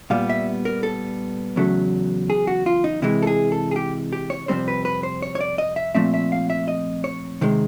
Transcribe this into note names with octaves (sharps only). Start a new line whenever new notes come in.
A#2 G3 B3 F5
E5
A#4
A4
E2 C#3 F#3 A3
G#4
F#4
F4
D#4
C3 E3 G#3 E4
A4
G#4
A4
G#4
G4
G4
C#5
F2 C3 D#3 G3 C4 C5
B4
B4
C5
C#5
C#5
D5
D#5
E5
A#2 F3 A3 C4 E5
E5
F5
E5
D#5
C#5
C3 D#3 G#3